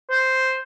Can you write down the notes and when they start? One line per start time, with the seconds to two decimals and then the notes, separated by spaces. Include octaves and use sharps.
0.10 C5